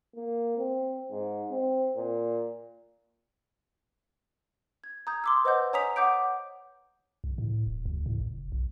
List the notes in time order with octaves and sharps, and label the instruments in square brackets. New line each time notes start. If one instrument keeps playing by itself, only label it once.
[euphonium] A#3
C4
G#2
C4
A#2
[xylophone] G#6
A#5 D#6 G6 G#6
C6 D6 E6
B4 C5 D#5 F#5 G6
C#5 G#5 A#5 D#6 B6 F7
F#5 D6 G6 D7
[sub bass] C2
A2
D#1
D2
A2
F#1
B1